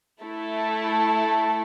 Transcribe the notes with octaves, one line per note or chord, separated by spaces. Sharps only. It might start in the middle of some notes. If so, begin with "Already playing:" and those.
A3 E4 A4